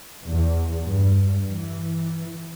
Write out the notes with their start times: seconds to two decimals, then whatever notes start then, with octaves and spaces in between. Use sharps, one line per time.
0.24 E2
0.84 G2
1.50 E3